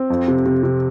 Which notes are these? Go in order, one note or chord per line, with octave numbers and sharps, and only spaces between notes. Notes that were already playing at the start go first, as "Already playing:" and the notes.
Already playing: C4
F2
C3
C3
C3